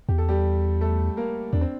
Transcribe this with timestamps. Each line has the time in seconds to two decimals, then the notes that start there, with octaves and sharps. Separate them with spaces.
0.09 E2 G4
0.18 A4
0.29 G3 G4
0.81 A3 A4
1.17 A#3 A#4
1.53 E2 D4
1.61 C4